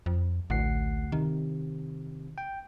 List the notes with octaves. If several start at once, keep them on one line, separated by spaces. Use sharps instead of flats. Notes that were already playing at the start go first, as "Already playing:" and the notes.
F2
A1 D2 F#5 C7
C3 D#3
G5